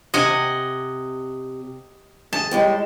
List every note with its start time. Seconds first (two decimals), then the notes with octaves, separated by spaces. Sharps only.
0.14 C3 D#5 F#5 G#5
2.33 G#4 A5
2.51 A2 G3 G#3